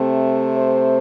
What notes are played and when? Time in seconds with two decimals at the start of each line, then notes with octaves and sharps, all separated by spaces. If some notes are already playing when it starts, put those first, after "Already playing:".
Already playing: C3 A3 C4
0.56 C5